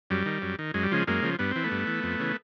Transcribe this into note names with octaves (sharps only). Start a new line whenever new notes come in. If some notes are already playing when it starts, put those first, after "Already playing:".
F#2 G3
D#3
F#2
D#3
F#2 G#3
G3
C#3 F3 G#3
F#2 G#3 A#3
C#3 F3
G2 B3
E3 C4
A3 B3
G2
E3
F2
C#3 E3